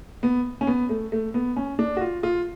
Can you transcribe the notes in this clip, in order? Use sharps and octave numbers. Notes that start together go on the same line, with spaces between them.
B3
C#4
B3
A3
A3
B3
C#4
D4
F#4
F4
F4